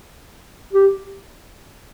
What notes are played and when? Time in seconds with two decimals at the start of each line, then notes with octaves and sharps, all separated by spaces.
0.73 G4